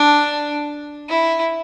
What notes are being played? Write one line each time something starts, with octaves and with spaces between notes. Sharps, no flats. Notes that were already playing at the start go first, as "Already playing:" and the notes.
Already playing: D4
E4